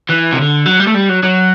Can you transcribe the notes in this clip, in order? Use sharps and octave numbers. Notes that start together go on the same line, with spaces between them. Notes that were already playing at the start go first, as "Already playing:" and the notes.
E3
C3
D3
F#3
G3
A3
G3
F#3
F#3